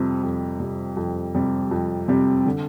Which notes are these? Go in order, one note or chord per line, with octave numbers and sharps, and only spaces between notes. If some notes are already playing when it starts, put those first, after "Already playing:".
Already playing: F2 C3 G3 C4
F2
C3 G3 C4
F2
C3 G3 C4
F2
C3 G3 C4
D3